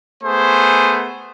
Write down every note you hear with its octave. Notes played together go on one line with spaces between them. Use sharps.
A3 B3 G#4 C5 G#5